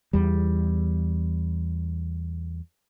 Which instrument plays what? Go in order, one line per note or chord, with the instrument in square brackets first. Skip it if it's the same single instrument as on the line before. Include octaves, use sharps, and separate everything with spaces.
[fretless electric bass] E2 G3